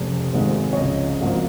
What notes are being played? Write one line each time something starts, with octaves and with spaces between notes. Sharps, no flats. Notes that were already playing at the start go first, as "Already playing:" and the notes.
Already playing: F1 F2 C#3
G#1 G#2 D#3 G#3
C#5
C#2 C#3 F3 D#5
G#1 G#2 F3 A#3